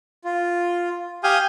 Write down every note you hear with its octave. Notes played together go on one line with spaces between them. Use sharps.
F4
G4 F5 G#5 D#6 F6 G6